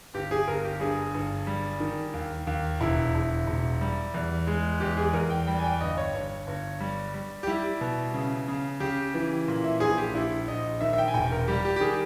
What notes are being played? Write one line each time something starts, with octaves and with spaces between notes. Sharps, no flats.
G1 G4
G#4
G1 A#4
G4
G2 G#4
G1
G3
D#3
D#2
D#2
E1 E4
E1
E1
G3
E2
G#3
E2 G4
G#4
E2 A#4
G5
G3 G5
G#5
G5
G1 D#5
C#5
G1
G1
G3
G3
G4
G3 E4
B2
C#3
C#3
C#3 G4
E3
A#2
E5
A#1 G#4
G4
A#1 E4
A#1 D#5
D#3 E5
E5
G5
G#5
E1 G5
A#4
G3 G4
G4
G4
D#3 G#4